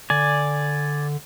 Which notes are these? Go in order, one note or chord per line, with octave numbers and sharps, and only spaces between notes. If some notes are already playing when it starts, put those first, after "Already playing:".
D3 D5 G#5